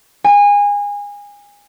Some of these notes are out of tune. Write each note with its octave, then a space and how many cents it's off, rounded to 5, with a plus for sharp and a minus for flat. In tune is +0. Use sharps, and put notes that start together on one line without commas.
G#5 -25